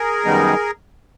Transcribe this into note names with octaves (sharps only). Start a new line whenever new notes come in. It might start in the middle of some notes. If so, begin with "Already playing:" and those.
Already playing: G#4 A#4
F#2 D#3 G3 B3 D#4